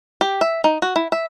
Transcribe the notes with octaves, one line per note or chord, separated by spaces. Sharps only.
G4
E5
D#4
F#4
E4
E5